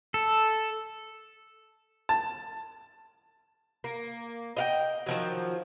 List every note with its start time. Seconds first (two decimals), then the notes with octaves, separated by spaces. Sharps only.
0.14 A4
2.09 A5
3.84 A#3
4.57 D#5 F5 G5
5.06 D#3 F3 F#3